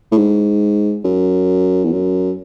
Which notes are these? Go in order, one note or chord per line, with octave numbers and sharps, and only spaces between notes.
A2
G#2
F#2
E2
F#2